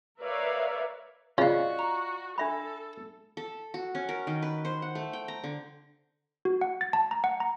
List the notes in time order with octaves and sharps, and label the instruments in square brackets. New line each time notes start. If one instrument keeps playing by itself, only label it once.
[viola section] A#4 B4 C#5 D5 E5 F5
[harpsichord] C#3 [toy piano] F4 D#5 [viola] F#4 C#6 [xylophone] D5 F5
[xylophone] A#5
[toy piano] D4 E5 B5 [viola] A4
[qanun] A4
F#4
C#4
A#4
D#3
B4
C5
F#5
A3
G5
A#5
D3
[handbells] F#4
F#5
A6
A5
A#5
F#5
A#5